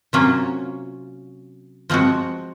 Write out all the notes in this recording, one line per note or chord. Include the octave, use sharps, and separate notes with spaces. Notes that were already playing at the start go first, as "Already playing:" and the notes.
C3 F#3 A#3 C#4 F4
F3 G#3 C4 F#4